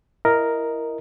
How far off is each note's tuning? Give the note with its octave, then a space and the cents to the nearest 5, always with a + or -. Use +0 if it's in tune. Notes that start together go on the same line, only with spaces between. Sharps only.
E4 +20 A#4 +0 D#5 +0